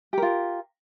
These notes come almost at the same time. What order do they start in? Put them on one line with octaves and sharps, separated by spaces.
G4 A#4 F4